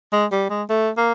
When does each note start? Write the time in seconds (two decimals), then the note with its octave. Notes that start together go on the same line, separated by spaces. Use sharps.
0.13 G#3
0.32 G3
0.50 G#3
0.69 A3
0.97 A#3